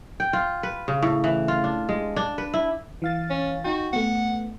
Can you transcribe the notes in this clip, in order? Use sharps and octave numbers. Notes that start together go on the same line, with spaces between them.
G5
F4
B4
C#3
A2
E3
F4
D4
G#3
D4
B4
E4
E3 F5 A6
C#4
D#4 F#4 G5
A3 B3 F#5